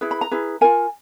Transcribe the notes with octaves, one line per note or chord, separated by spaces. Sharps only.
E4 G#4 B4
B5
A#5
E4 G#4 B4
F4 A#4 G#5